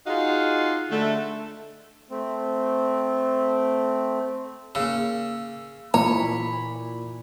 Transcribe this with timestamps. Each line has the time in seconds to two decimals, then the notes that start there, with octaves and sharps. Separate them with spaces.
0.07 D#4 F4 F#4 G#4 D#5 F5
0.91 D3 A3
2.11 A3 C4
4.75 C#3 A#3 E6
5.94 A#2 E3 C#5 A#5 B5